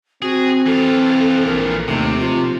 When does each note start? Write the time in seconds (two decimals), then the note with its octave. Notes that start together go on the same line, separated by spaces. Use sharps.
0.22 C4 F#4 G#4
0.66 E3 F4 A4
1.47 A#1 A#4
1.88 D#2 C3 A3
2.20 F3 F4